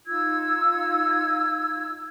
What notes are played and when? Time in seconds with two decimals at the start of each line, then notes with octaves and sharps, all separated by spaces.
0.06 D#4 F4 E6 G#6